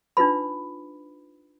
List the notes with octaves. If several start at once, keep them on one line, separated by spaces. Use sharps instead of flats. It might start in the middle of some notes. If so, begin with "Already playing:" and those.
D4 D#4 F4 B4 B5